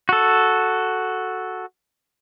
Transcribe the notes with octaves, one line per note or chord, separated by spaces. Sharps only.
F#4 A4